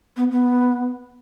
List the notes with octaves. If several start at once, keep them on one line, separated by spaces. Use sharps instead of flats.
B3
B3